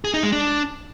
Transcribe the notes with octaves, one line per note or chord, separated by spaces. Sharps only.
G#4
D#4
G#3
D4